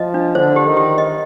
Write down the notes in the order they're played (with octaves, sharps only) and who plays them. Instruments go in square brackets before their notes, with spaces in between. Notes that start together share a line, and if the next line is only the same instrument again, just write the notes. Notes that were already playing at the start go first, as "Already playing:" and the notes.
Already playing: [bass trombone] F3 [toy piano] D#5
[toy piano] D4
[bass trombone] D3 [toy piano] C5
[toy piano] G4
[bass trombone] D#3
[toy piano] G4
D#5